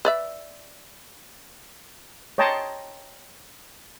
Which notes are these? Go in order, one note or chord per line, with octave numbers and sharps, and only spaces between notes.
B4 D5 E5
C#5 D#5 G5 A5 A#5 C6